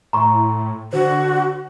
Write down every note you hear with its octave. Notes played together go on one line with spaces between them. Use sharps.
A2 A#5 C6 C#6
D3 F#4 C5